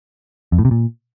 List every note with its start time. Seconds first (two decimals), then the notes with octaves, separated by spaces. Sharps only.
0.52 F2
0.59 A2
0.65 C3
0.71 A#2